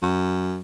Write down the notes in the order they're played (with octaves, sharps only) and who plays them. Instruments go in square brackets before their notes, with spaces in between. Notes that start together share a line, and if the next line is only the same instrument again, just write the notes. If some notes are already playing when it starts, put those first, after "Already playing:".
[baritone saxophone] F#2